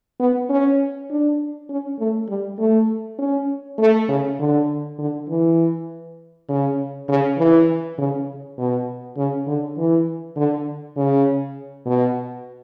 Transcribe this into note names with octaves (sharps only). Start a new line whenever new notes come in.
B3
C#4
D4
C#4
A3
G3
A3
C#4
A3
C#3
D3
D3
E3
C#3
C#3
E3
C#3
B2
C#3
D3
E3
D3
C#3
B2